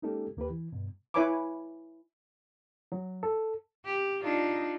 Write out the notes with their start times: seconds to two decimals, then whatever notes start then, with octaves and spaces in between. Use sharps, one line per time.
0.02 G#3 A#3 C#4 D#4 G4 A4
0.37 D#2 A#3 G4 B4
0.50 E3
0.72 G2 B2
1.14 E4 B4 C#5 G#5 B5 D6
2.92 F#3
3.23 A4
3.85 G4
4.23 D4 D#4 F4